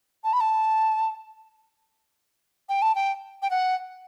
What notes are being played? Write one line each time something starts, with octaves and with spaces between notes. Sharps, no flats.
A5
B5
A5
G5
A5
G5
G5
F#5